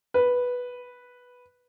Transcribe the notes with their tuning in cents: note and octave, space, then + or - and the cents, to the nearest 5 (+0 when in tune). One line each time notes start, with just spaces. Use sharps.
B4 -5